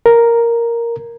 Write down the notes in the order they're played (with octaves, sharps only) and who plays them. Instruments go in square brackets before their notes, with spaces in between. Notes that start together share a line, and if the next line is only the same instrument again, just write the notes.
[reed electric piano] A#4